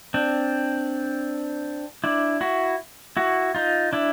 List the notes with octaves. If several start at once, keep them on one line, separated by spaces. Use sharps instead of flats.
C4 D4
D4 E4
E4 F#4
E4 F#4
D#4 F4
D4 E4